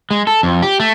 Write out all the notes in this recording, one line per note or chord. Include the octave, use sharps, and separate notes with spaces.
G#3
A4
F2
G4
A3